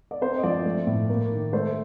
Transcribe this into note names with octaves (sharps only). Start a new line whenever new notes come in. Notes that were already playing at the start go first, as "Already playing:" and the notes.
D5
C4 C5
D#5
F3 D5
A3
A2
A#3
D#3
A3 C5